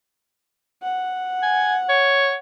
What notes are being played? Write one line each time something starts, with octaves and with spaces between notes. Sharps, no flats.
F#5
G#5
C#5